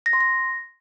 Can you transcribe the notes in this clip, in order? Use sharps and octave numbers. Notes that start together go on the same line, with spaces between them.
A#6
C6
A#6